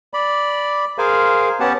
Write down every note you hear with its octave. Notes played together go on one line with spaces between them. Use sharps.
D5 B5
G#4 A#4 C5 F5 G#5
B3 C#4 G4 F#5 A5